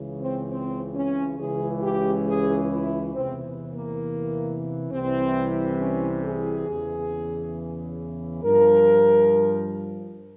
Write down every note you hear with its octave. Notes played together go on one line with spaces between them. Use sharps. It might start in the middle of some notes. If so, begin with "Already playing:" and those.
Already playing: C#2 C#3 E3
C4
C4
C#4
C#2 C#3 E3 G#4
G4
G#4
E4
E2 C3 E3 C4
A#3
C2 C3 E3 C4
C#4
G#4
E2 C#3 E3
G2 F3 A#4